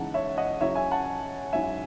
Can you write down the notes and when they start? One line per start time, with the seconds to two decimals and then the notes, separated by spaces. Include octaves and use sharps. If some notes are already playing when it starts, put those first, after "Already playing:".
Already playing: C#3 E3 G#3 D#4 F#5 A5
0.14 C#5 E5
0.37 D#5 F#5
0.61 C#3 F#3 C#4 E4 C#5 E5
0.75 E5 G#5
0.91 F#5 A5
1.53 G#2 F#3 C#4 E4 E5 G#5